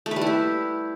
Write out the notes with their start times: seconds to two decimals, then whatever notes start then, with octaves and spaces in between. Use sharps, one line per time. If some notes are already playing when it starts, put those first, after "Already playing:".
0.06 A3
0.11 B4
0.16 G3
0.21 E4
0.27 G4